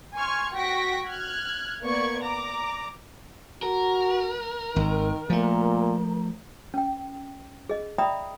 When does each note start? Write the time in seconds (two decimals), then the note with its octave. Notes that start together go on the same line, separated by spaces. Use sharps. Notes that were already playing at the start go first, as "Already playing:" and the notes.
0.14 G#5 C6 C#6 F6 G#6
0.54 F#4 G5 C#6 A#6 B6 D7
1.07 F6 F#6 G#6
1.83 A#3 B3 D5 C#6 G#6
2.20 D5 A#5 D6
3.63 F#4 A#4
4.76 G#1 D#3
5.30 A#2 F3 A3
6.74 C#4 G5
7.69 G#4 D#5
7.98 D5 E5 G5 A#5 B5 D#6